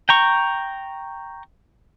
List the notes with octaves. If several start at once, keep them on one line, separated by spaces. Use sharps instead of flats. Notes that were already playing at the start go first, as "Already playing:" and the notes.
G5 A#5 C#6